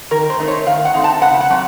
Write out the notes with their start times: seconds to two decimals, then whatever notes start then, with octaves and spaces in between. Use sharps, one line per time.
0.11 D#3 A#4
0.30 C5
0.39 A3 C4 D#4
0.48 C#5
0.66 D#3 F5
0.85 F#5
0.94 A3 C4 D#4
1.04 A5
1.22 C#3 F#5
1.41 F#5
1.50 F#3 C4